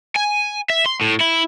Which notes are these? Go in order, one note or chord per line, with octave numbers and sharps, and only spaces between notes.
G#5
E5
C6
A2
E4